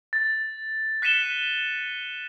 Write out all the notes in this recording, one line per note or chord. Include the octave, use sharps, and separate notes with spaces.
A6
F#6 B6 C#7 D#7 E7 G7